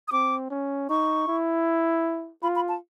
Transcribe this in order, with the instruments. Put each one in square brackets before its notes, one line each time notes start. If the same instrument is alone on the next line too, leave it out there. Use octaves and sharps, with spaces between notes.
[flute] D#6
[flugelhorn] C4 [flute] D6
[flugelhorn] C#4
[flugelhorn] D#4 [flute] C#6
[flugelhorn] E4
[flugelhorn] F4 [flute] B5
[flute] B5
A5